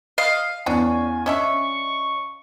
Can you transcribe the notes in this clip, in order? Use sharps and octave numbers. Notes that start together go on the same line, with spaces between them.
D#5 F5
E2 C#4 D4 G#5
C#4 D4 D#5 E5 C#6